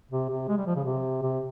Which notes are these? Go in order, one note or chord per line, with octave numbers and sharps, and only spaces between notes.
C3
C3
G#3
G3
F3
C#3
C3
C3